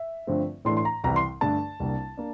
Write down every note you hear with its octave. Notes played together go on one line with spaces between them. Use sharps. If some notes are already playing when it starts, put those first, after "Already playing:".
Already playing: E5
G2 D3 F3 A3 C4
A2 E3 A3 D4 C6
C6
A#5
C2 C3 E3 G3 A#5
C6
G2 D3 A3 D4 A5
C2 C3 G3 A#3 D4
A#3 D4